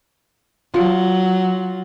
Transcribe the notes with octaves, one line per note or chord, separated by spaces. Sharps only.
F#3 F4